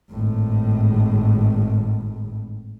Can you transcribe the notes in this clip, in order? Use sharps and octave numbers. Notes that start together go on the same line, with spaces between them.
G#1 A2